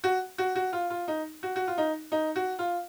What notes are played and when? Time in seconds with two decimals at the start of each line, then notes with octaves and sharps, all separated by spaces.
0.04 F#4
0.38 F#4
0.56 F#4
0.73 F4
0.90 F4
1.08 D#4
1.43 F#4
1.56 F#4
1.67 F4
1.78 D#4
2.12 D#4
2.36 F#4
2.59 F4